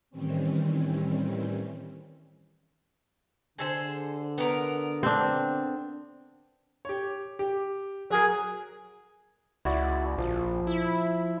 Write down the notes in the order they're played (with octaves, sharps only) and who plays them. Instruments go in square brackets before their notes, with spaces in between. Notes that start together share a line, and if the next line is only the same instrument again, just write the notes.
[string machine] A2 D#3 E3 G3 C4 C#4
[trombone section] D3 [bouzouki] G#4 A4 C5
[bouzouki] B3 A#4
[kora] C4 D4
[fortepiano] G4 C#5
G4
[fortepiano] F#3 A#4 [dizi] G#4
[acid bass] C#2 [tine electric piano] E4 F#4 D5
[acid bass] A#1 [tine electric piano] F3
[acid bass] E4